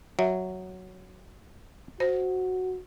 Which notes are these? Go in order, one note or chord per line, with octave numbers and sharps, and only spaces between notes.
F#3 E5
F#4 C5